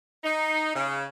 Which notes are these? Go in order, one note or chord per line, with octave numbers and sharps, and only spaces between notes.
D#4
C#3